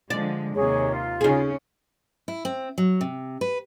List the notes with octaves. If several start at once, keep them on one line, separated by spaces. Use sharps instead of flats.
D3 F3 G#3 D5
D#2 C3 G#4 C#5
F4
C#3 C#4 D#4 G#4
E4
C4
F#3
C3
B4